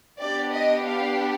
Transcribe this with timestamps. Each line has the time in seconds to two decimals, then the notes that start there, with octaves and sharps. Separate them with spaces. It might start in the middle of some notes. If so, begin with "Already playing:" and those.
0.20 B3 D4 G4 D5
0.53 D#5
0.86 F5